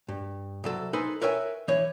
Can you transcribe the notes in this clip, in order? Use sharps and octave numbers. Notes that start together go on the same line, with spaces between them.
G2
C2 F#3 A4
D#4 A4 B4 C5 G#5
A#4 B4 C#5 E5 G5 G#5
E3 C#5